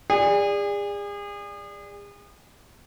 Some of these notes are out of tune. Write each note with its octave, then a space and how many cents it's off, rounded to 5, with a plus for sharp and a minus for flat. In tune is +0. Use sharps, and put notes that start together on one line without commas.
G#4 -35 D5 +0